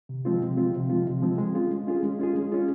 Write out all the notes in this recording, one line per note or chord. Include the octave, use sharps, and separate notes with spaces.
C3
F3 G#3 C4 F4
C3
F3 G#3 C4 F4
C3
F3 G#3 C4 F4
C3
F3 G#3 C4 F4
G#3
C#4 F4 G#4
G#3
C#4 F4 G#4
G#3
C#4 F4 G#4
G#3
C#4 F4 G#4